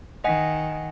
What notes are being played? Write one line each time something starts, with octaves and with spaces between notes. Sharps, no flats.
D#3 D#5 F#5 G#5